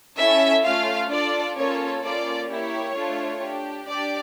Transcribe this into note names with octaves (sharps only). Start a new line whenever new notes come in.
C#4 E4 A4 E5
A3 C#4 F4 F5
D4 F4 A4 D5
A#3 C#4 F4 A4 C#5
A#3 C#4 F4 A4 D5
A#3 E4 G4 C#5
A3 D4 F4 A4
D4 G4
D4 G4 D5